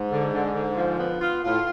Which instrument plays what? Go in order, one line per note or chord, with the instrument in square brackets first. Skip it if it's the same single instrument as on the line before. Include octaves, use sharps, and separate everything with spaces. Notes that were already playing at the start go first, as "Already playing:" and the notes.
Already playing: [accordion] G#2
[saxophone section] D3
D3
D3
F3
B3
F4
[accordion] A2 [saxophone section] F4